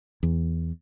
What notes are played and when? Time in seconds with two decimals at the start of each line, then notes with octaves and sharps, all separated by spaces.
0.23 E2